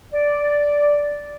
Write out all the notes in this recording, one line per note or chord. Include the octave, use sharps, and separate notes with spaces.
D5